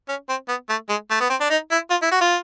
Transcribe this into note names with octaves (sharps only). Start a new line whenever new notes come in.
C#4
C4
B3
A3
G#3
A3
B3
C4
D4
D#4
E4
F4
E4
F#4
F4